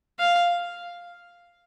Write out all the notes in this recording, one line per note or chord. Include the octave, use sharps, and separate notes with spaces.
F5